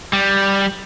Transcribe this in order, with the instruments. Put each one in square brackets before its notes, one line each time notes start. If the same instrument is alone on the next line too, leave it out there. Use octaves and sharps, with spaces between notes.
[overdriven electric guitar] G3